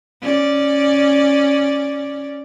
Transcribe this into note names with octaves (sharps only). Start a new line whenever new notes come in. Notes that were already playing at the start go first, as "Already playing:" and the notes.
C#4 D5